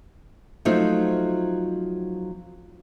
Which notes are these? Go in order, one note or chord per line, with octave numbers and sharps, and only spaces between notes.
F3 F#3 A3 C4 D#4 F4